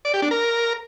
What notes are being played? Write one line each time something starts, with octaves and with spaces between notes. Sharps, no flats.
D5
G4
D4
A#4